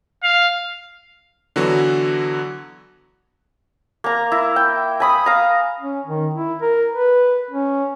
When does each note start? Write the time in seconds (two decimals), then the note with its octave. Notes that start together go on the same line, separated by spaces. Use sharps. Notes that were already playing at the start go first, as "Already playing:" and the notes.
0.23 F5
1.56 D3 E3 F#3 B3 F#4
4.04 A#3 A#5
4.32 E4
4.56 G5
5.00 G#5 B5 D#6
5.26 F5 A#5
5.81 C#4
6.06 D#3
6.34 E4
6.62 A#4
6.92 B4
7.51 C#4